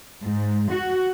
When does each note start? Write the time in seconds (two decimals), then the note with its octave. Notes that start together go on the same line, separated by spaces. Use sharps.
0.22 G#2
0.70 F#4